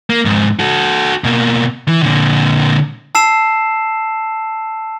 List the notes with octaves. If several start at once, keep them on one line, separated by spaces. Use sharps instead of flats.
A#3
F2 G#2
F#4 A4
B2 A#3
E3
A#2 D3
A5 E6 C7 E7